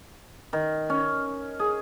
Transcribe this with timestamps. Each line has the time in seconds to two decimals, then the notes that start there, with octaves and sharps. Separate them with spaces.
0.53 D#3
0.90 C#4
1.59 G#4